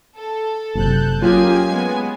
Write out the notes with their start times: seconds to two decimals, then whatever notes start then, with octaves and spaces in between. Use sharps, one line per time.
0.17 A4
0.75 F#1 C3 A5 F#6 G6
1.21 F#3 A#3 C#4 F4 G4 G#4 G#5
1.68 G#3 B3